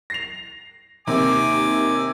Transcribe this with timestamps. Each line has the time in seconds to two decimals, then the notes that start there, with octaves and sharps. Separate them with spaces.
0.10 A#6 C7 F7
1.07 D#2 C3 D#3 G#5 D6 E6